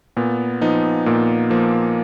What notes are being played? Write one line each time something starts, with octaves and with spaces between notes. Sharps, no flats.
A#2 B3
F3 B3 D#4
A#2 A#3
F3 A#3